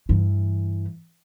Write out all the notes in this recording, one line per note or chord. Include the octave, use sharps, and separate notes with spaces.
G2 E3